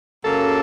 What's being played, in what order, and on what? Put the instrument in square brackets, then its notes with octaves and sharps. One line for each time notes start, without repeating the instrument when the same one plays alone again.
[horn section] F#2 C#3 F#3 A#3 [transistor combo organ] A4